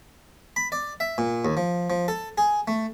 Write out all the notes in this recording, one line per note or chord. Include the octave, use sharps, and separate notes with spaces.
B5
D5
E5
A#2
D#2
F3
F3
A4
G#4
A3